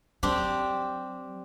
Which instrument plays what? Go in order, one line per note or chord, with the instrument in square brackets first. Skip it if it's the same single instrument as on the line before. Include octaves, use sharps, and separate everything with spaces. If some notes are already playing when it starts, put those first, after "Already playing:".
[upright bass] F#3 [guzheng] C4 D4 G4